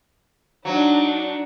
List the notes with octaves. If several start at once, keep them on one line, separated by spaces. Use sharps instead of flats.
F#3 D4 D#4